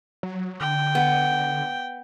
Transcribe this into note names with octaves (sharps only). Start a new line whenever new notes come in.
F#3
D3 G5
B3